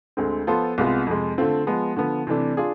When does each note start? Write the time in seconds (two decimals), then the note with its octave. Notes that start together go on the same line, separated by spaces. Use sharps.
0.17 D2 D3 G#3 C4
0.47 F3 B3 F4 A4 C5
0.78 C2 C3 G#3 B3 F4
1.07 F2 C3 G#3
1.38 D3 A3 C4 F4
1.67 F3 G#3 B3
1.96 D3 F3 B3
2.27 C3 E3 A3 D4
2.57 D4 F4 G#4